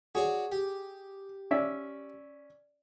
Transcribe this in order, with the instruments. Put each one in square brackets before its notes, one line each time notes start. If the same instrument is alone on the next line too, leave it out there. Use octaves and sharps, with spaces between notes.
[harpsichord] F#4 C#5 D5 [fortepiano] G#4
[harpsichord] G4
[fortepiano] C#4 D5 E5